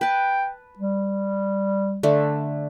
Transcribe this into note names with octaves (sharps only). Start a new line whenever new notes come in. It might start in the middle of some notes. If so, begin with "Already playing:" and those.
B4 G5 A5
G3
D3 A3